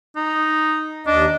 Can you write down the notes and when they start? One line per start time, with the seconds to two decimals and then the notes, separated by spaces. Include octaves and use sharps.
0.16 D#4
1.07 D#2 D4 D#5